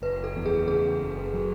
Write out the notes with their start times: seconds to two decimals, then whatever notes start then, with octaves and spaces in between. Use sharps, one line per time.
0.02 F#1 B4
0.24 A4
0.36 E2
0.46 G#4
0.68 C#3 G#4
1.01 F#1
1.34 F#3